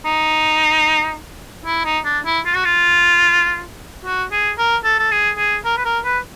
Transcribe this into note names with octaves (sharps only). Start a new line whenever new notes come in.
D#4
E4
D#4
D4
E4
F4
F#4
F4
F#4
G#4
A#4
A4
A4
G#4
G#4
A#4
B4
A#4
B4